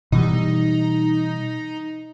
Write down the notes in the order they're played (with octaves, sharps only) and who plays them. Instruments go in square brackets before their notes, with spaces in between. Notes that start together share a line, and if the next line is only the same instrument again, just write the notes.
[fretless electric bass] B2 E3 G3 [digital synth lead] D#4